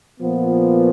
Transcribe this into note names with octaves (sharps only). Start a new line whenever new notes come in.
A#2 F3 B3